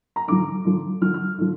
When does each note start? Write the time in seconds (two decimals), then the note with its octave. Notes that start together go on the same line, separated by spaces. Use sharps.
0.16 A#5
0.28 D3 F3 D6
0.65 D3 F3
1.02 D3 F3 F6
1.14 F6
1.38 D3 F3